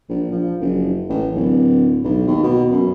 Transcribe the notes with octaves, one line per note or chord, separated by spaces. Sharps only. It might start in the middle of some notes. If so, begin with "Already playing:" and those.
A#1
F3
F#1
A1
D1
B1
D#2
B2
F#2